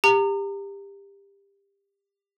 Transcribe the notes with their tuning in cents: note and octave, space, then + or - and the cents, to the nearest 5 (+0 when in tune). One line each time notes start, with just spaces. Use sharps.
G4 +25 A#5 -25